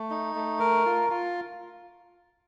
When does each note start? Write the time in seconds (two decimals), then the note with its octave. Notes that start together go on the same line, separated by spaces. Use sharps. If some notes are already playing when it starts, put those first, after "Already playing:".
Already playing: A3
0.10 D#4
0.35 A3
0.59 A#4
0.85 F4
1.10 F4